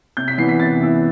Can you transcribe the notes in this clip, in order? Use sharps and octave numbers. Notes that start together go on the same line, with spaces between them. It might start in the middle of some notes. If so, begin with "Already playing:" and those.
C3 G6
B6
E3 B3 E4 C7
B6
C3 A6
E3 B3 E4